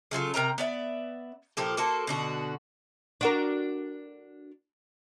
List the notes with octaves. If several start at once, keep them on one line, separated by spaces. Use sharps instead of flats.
C#3 F#3 F4 A4
C3 A#4 G5 A#5
B3 D5 E5
A#2 F3 G4 A4
A#3 F#4 A4 C5
B2 D3 F#4
D4 F#4 A#4